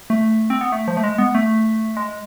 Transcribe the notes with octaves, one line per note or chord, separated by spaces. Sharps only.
A3
C4
B3
A3
F3
A3
G#3
B3
A3
G#3